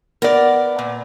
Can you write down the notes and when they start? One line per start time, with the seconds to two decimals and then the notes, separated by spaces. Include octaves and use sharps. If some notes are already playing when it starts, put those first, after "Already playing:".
0.22 B3 A#4 D5
0.79 A#2